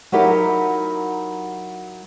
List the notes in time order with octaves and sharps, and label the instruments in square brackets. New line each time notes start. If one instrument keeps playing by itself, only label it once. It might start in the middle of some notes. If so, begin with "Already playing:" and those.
[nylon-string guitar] F#3 D#4 E4 G4 A#4